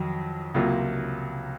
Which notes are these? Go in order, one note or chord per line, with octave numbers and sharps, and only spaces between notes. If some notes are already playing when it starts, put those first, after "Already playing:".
Already playing: F2 D#3 F#3
C#2 C3 F#3 A#3 F4